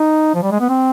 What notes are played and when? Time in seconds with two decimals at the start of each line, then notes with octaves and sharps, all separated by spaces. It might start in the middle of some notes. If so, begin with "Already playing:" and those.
Already playing: D#4
0.35 F3
0.43 G3
0.52 G#3
0.60 B3
0.69 C4